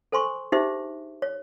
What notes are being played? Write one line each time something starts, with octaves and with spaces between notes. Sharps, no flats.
A4 C5 G#5 C6 C#6
D4 D#4 G4 G#4 C5 E5
C#5